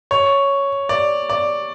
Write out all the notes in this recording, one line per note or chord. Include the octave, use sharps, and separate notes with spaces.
C#5
D5
D5